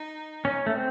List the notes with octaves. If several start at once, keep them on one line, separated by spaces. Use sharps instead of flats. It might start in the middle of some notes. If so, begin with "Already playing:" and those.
Already playing: D#4
C#4
A3
C4